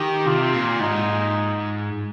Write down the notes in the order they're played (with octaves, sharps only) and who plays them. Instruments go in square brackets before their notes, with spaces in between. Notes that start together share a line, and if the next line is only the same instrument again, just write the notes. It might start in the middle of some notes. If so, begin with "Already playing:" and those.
Already playing: [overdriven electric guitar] D#3 [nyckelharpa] G4
[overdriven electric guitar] C3 [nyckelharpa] F4
[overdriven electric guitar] A#2
[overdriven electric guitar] G#2 [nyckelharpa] D#4